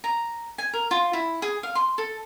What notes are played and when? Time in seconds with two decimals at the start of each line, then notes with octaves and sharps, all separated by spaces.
0.04 A#5
0.58 G#5
0.73 A#4
0.91 F4
1.13 E4
1.42 G#4
1.63 F5
1.75 C6
1.98 A4